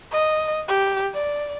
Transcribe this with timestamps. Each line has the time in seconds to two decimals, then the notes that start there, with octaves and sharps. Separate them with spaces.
0.11 D#5
0.68 G4
1.14 D5